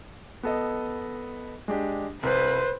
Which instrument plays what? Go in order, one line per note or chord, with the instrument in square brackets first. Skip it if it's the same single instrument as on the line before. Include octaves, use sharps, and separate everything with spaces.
[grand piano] B3 A4 D#5
G#3 D4 G4
[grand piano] C2 [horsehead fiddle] B4 C5